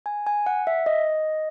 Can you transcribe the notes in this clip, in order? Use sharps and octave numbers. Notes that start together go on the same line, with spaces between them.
G#5
G#5
F#5
E5
D#5